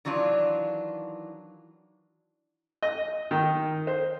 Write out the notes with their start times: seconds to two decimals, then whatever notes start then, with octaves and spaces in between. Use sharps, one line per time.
0.05 D#3 E3 F#3 D4 F4
2.83 D#5
3.31 D#3
3.87 C5